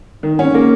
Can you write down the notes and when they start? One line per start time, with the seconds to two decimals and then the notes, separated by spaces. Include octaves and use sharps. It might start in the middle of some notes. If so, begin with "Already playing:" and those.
0.23 D#3
0.39 C#4
0.54 A#3